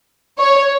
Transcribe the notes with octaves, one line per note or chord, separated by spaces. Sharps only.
C#5